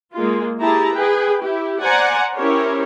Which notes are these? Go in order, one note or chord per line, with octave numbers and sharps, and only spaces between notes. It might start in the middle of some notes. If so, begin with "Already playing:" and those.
G#3 A#3 F4
E4 G4 G#4 A5 A#5
G#4 B4 G5
E4 G4
C5 D5 F#5 G#5 A#5
C#4 E4 G4 A#4 C5 C#5